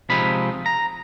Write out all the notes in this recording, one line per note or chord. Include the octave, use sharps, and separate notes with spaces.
C3 F3 G#3 C4 D#4 B5
A#5